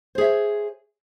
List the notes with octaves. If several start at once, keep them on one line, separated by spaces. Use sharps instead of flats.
G#4 C5 C#5 E5